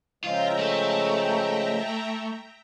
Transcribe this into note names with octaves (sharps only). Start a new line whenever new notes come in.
C#3 F3 G#3 F4 E5 G5 A#5
A3